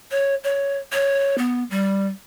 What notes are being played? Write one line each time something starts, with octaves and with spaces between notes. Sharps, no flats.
C#5
C#5
C#5
B3
G3